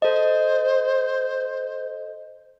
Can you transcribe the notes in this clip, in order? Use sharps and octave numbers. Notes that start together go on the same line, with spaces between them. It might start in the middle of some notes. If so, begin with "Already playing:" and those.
A4 C5 D#5